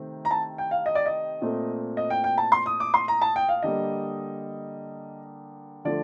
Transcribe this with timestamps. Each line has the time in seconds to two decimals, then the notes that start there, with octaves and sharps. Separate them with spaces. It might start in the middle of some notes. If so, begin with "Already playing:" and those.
Already playing: C3 D#3 A3 C4
0.25 A#5
0.31 A5
0.58 G5
0.71 F5
0.86 D#5
0.95 D5
1.06 D#5
1.41 A#2 A3 C4
1.97 D#5
2.10 G5
2.24 G5
2.38 A5
2.52 C6
2.66 D#6
2.80 D6
2.94 C6
3.08 A#5
3.21 A5
3.36 G5
3.49 F5
3.62 D3 G3 A#3 D#5
5.85 D3 F3 A3 D5